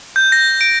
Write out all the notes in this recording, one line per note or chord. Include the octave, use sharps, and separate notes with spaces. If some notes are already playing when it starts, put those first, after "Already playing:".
G6
A#6
D7